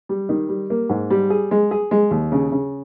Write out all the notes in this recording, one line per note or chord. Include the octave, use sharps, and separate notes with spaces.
G3
D#3
G3
A#3
G#2
G3
G#4
G#3
G#4
G#3
D#2
C#3
C#3